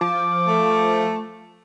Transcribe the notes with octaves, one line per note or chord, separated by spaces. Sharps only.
F3 D6
A3